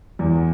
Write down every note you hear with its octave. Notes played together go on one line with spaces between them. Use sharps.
E2